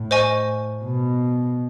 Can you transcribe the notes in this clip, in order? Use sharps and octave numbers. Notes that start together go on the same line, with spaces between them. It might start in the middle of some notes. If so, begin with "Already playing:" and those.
Already playing: A2
C5 D#5 G#5 C#6
B2